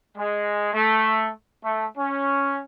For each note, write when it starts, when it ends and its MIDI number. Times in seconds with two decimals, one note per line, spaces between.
0.17 0.71 56
0.74 1.30 57
1.64 1.86 57
1.98 2.60 61